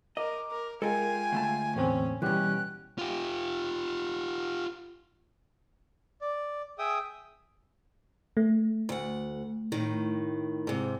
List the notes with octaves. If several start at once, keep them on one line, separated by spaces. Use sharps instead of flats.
A#4 D#5 D6
A#4
G#3 F4 A4 A#4 G5 G#5
D2 A3 A5
E2 A2 C4 C#4
D2 B2 E3 G3 C#4 G4 G5 F#6
F4 G4
D5
G#4 E5 G5 D#6
A3
D2 F#5
A2 D#3
G#2 C3